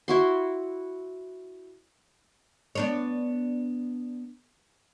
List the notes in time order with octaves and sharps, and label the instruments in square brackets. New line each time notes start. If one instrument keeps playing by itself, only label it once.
[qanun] E4 F#4 C6
[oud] B3 D4 C#5